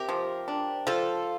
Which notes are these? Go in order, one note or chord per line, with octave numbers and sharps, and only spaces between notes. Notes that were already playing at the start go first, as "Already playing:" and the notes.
Already playing: C3 G4 A#4
F3
D4
F3 F4 A4